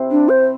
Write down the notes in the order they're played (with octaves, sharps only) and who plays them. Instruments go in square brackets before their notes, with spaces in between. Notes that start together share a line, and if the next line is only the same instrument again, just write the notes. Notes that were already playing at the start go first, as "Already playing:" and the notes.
Already playing: [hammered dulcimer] C3 C4 E4
[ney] D4
C5